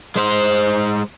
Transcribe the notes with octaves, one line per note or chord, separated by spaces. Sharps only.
G#3 C5